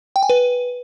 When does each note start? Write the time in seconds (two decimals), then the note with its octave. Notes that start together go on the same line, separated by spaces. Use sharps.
0.16 G5
0.23 G#5
0.29 B4